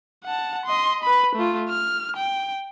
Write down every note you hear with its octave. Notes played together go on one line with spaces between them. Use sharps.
F#5 A5
D#5 C6
B4 B5
A3 F4
F6
G5